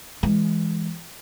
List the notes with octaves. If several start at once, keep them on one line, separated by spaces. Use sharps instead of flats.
E3 G#3